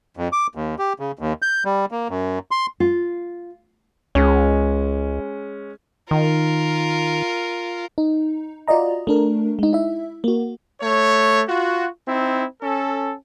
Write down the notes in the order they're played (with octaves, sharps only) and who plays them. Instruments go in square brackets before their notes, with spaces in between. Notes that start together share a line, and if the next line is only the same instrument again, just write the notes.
[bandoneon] F2
D6
D#2
G4
C#3
D#2
G6
G3
A#3
F#2
C6
[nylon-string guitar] F4
[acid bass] C#2 [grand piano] G#3 C#4
[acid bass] D#3 [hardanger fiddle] F4 A#4
[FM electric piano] D#4
F4 F#4 D5 D#5 A#5
A3 D4 A#4
G#3 D#4
E4 E5
A#3 F#4
[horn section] A3 C#5
F4 F#4
C4 D#4 E4
C#4 A4